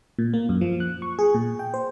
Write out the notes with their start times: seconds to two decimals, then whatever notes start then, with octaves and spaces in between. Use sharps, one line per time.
0.19 A#2
0.33 A#3
0.49 F#2
0.61 F3
0.80 F#6
1.02 C#6
1.19 G#4
1.34 A#2
1.59 G5
1.74 C5